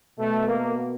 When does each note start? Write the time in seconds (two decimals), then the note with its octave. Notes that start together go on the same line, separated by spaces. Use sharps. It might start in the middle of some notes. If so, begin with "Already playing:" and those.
0.18 B2 A3
0.47 A#3